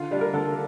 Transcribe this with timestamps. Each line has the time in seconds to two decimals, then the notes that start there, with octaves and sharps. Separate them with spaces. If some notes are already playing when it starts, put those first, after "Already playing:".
Already playing: D3 F4
0.11 G3 D4
0.21 A#4
0.33 D3 A4